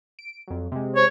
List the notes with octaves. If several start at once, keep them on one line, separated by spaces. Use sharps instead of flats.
D7
F2 F#3
C3 G#3
C5 C#5